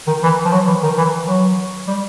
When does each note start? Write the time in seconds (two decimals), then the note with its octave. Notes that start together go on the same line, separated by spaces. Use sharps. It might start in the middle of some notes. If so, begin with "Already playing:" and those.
0.07 D#3
0.23 E3
0.45 F3
0.52 F#3
0.67 E3
0.83 D#3
0.98 E3
1.27 F#3
1.88 G3